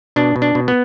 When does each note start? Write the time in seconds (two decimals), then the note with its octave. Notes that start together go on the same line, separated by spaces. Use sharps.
0.16 B2 D4
0.36 B2
0.42 D4
0.55 B2
0.68 B3